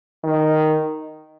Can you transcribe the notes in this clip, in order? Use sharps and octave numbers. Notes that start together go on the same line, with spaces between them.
D#3